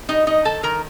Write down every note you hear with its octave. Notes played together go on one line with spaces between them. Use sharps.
G3 D#4 D#5
D4 D#4 D#5
D#3 A4 A5
D#3 A#4 A#5